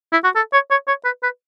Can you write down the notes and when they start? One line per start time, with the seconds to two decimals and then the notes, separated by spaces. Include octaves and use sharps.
0.13 E4
0.24 F#4
0.36 A4
0.53 C#5
0.71 C#5
0.88 C#5
1.05 B4
1.23 B4